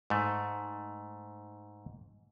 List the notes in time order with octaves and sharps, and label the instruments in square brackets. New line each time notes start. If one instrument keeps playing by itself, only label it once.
[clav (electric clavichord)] G#2 A3